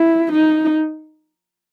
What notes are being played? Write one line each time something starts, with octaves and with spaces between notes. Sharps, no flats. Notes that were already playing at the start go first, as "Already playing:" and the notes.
Already playing: E4
D#4